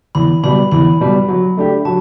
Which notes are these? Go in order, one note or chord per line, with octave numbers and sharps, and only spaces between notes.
E2 B5
B2 G3 B5
E2 B5
B2 G3
F#3
A3 D4 G4
F#3 A5